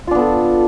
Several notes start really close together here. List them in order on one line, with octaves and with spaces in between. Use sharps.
F4 D4 B3 A4